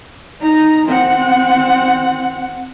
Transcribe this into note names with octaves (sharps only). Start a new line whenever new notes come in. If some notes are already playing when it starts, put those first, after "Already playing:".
D#4 A#5
C4 F#5